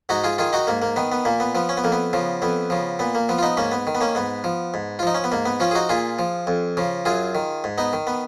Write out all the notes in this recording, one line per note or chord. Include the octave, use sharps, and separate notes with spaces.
G#2 D#4 F#4
F4 G#4
D#3 F4 G#4
D#4 F#4
G#2 A#3
A#3
D#3 B3
B3
A#2 A#3
B3
F3 B3
C#4
B3
F2 A#3
B3
C#3 F3
F2 B3
C#3 F3
A#2 B3
A#3
F3 B3
F4
B3 D#4
G#2 A#3 C#4
B3
D#3
B3
A#3 C#4
G#2 B3
F3
G#2
F4
F3 D#4
C#4
B3
G#2 A#3
B3
F3 C#4 F4
G#4
D#4 F#4
A#2 F4 G#4
F3
F2
C#3 F3
F#2 F4 G#4
D#3
G#2
B3 D#4
D#3
B3